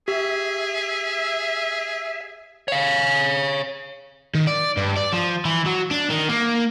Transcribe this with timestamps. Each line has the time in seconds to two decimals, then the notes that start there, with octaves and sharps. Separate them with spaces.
0.08 G4 G#4 E5
2.68 C#5 F5
4.35 D#3
4.47 D5
4.77 G2
4.96 D5
5.13 F3
5.45 E3
5.66 F#3
5.91 D4
6.10 D#3
6.29 A#3